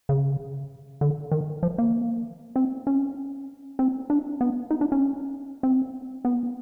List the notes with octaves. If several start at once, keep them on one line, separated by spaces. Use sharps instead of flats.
C#3
D3
D#3
F3
A#3
C4
C#4
C4
D4
B3
D#4
D4
C#4
C4
B3